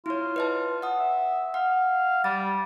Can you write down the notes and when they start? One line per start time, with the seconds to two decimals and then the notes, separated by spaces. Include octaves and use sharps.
0.06 E4 F4 C#5
0.36 B4 D#5 A5
0.82 F#5 D#6
0.99 E5
1.54 F5 F#5
2.24 G3 A6